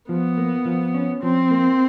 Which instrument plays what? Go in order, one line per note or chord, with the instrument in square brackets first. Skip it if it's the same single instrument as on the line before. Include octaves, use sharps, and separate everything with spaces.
[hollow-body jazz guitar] F3 [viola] B3
[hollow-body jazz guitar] A#3
F3
C#4
[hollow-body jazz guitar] F3 [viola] C4
[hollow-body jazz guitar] A#3